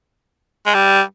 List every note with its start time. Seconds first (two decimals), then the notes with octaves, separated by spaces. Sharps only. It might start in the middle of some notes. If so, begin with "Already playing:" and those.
0.66 G#3
0.75 G3